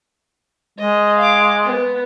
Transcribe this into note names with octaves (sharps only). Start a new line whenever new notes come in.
G#3 D#5
F5 D6
B3